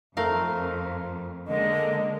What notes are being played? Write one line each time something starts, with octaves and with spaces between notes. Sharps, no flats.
F2 A3 A#4 F5
D3 G#3 A#3 D#5